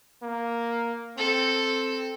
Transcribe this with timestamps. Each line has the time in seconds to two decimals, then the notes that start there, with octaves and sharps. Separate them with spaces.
0.22 A#3
1.18 C4 A4